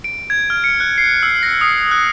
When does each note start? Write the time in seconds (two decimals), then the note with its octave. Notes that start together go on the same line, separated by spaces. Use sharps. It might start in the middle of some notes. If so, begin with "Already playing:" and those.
0.04 D7
0.30 G#6
0.50 F6
0.64 C#7
0.80 F#6
0.98 C7
1.23 E6
1.43 A#6
1.61 D#6
1.91 F#6